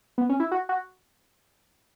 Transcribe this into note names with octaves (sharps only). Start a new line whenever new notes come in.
B3
C#4
E4
F#4
F#4